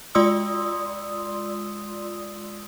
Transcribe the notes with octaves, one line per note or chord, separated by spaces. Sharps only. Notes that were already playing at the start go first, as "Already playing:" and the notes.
G#3 F4 D5 C6 D#6 E6